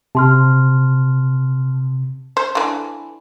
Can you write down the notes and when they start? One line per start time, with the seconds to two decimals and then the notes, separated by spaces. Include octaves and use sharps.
0.15 C3 A5 C6 F6
2.37 C5
2.55 D3 E3